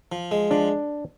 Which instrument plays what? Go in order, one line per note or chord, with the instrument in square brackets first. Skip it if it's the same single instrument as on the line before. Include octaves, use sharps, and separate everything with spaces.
[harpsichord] F3
G#3
[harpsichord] F3 [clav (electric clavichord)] D4